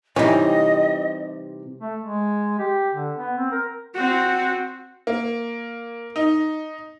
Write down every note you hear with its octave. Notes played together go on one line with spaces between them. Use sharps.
C3 E3 G3 C#4 D#4 D#5
A3
G#3
G4
D3
B3
C4
A#4
C4 F#4
A#3
D#4